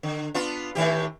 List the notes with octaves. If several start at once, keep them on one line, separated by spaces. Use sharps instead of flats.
D3
B3 D4 F4
A2 D#3 G4